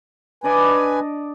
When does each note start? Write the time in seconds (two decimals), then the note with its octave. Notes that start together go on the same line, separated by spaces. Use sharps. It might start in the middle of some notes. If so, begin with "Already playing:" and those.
0.44 D4 B4 D5 D#5 G#5